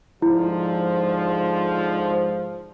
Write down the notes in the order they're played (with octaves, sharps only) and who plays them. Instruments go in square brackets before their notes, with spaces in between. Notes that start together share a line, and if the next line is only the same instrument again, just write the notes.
[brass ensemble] G#2 D3 F3 [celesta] E4